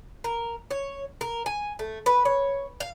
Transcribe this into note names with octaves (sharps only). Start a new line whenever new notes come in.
A#4
C#5
A#4
G#5
A3
B4
C#5
F5